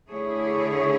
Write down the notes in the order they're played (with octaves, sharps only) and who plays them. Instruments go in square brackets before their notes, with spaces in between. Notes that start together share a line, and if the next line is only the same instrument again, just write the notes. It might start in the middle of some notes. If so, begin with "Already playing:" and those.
[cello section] D3 A3 E4 G#4 C#5